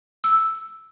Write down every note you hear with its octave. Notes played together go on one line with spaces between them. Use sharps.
E6